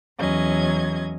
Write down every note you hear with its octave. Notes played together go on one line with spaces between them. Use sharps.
E2 F#3 C#4 D#5 G#6